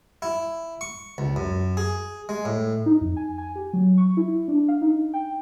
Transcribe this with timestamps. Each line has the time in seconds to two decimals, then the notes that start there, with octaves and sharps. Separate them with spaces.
0.22 E4
0.81 C#6
1.18 C#2
1.36 F#2
1.77 G#4
2.29 G#3
2.45 A2
2.86 D#4
3.01 F2
3.16 G#5
3.38 G#5
3.55 G4
3.73 F#3
3.97 C#6
4.17 E4
4.48 D4
4.68 F5
4.82 D#4
5.14 G5